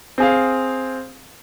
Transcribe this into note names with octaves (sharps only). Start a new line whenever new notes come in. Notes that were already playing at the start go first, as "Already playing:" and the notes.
C4 G#4 F5